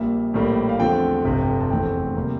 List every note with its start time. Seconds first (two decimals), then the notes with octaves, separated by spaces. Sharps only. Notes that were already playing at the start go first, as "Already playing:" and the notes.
Already playing: A#1 A#2 G3 A#3 E5
0.34 A#1 A2 G3 A#3
0.69 F5
0.79 E2 D3 F3 A3 C4 G5
1.25 G1 F2 C3
1.60 A5
1.70 F1 E2 E3 A3 C4 G5
2.16 C3 G3 A#3